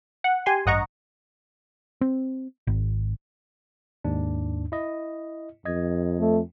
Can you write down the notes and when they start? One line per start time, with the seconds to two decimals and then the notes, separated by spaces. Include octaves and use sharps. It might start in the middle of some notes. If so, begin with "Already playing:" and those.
0.24 F#5
0.46 G4 G#5 C6
0.66 A1 G2 D#5 F#5 A#5 C#6
2.01 C4
2.67 G#1
4.04 D#2 G#2 D4
4.72 E4 D#5
5.65 F2 D#5 G#6
6.20 A3